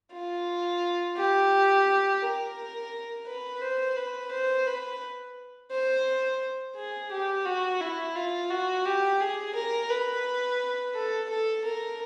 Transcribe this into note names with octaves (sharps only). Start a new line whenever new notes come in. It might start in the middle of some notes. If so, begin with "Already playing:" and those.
F4
G4
A#4
B4
C5
B4
C5
B4
C5
G#4
G4
F#4
E4
F4
F#4
G4
G#4
A#4
B4
A4
A4
A#4